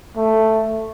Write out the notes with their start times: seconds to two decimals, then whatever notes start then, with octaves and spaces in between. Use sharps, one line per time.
0.16 A3